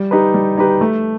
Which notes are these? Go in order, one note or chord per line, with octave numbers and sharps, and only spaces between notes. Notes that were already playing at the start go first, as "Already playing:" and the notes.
Already playing: G3
D#4 G4 B4
G3
D#4 G4 B4
A3